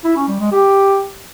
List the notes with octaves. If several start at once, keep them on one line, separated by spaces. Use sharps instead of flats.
E4
C#4
G3
G#3
G4